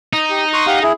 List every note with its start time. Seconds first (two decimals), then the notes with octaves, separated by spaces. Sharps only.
0.13 D#4
0.30 G4
0.54 C6 C#6 F#6
0.67 G4 F5 F#5
0.82 E4 G#4